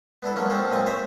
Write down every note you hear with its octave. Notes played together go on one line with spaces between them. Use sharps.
B3 D4 E4 A4
F#3 G#3 A#3 C#4
G#3 C4 C#4 F4 A4
C#2 A#2 C4 D#5 G#5
C5 C#5 E5 A#5